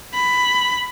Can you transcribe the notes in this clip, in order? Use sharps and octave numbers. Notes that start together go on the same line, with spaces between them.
B5